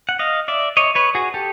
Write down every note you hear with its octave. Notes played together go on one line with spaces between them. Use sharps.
F#5
D#5 F5
D5 E5
C#5 D#5
B4 C#5
F#4 G#4
G4 A4